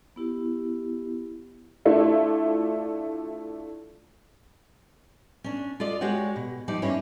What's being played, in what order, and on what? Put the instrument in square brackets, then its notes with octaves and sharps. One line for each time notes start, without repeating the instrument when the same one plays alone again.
[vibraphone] B3 E4 G4
[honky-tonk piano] A3 D4 E4 F4
[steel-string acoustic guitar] C#4 D4
F4 A4 D5 D#5
G#3 F#4 G4 C#5 F#5
B2
F3 G3 D#4 D5
G2 A#3 C#4 E4 C#5